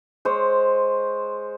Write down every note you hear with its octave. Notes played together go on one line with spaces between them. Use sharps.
G#3 C5 C#5